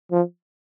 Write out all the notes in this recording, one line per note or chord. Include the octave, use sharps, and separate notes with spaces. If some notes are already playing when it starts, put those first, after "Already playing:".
F3